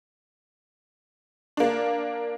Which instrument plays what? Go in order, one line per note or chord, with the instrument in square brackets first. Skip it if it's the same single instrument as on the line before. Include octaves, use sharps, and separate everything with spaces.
[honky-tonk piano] A#3 D4